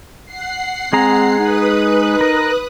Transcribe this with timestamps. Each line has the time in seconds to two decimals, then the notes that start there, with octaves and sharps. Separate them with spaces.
0.25 F#5 C7
0.93 G#3 C4 G#4 A#5
1.38 D#4 B4 D#6 F#6
2.21 A#4